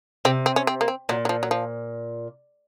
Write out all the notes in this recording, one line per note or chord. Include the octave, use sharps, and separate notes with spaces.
C3 C4
C4
C#4
C4
A#3
C4
A#2 F#3
F#3
F3
F#3
F3